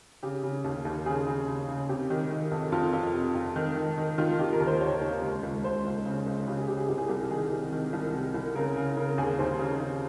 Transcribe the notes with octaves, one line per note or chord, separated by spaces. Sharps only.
C#3 G4
C#3
D#2
D#2
C#3 G#4
C#3
C#3
C#3
C3 G4
D#3
D#3
F2
F2 F4
F2
C3
F2
D#3
D#3
D#3
D#3 F4
D#3 G4
A#4
D#2
C5
D#2 C#5
D#2
C#2
C#2
C#2 C5
C#2
C#3
C#2
C#3 G4
G#4
C#3 G4
G#4
C2 G4
G#4
C2 G4
D#3 G#4
C3
D#3
C2
C3
C2
C#3 A#4
C#3
C#3 A#4
D#2 G#4
D#2 C5
C#3
C#3